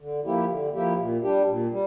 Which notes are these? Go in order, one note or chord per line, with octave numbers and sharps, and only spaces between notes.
D3
F3 A#3 E4 G4
D3
F3 A#3 E4 G4
A#2
G3 D4 G4
A#2
G3